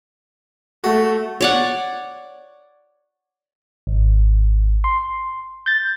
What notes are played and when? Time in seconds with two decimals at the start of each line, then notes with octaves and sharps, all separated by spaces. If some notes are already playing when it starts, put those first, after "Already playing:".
0.84 A3 F#4
1.41 C#5 D5 F#5
3.87 G#1
4.84 C6
5.66 G6 A6